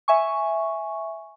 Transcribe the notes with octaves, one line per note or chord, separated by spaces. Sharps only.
E5 G#5 C#6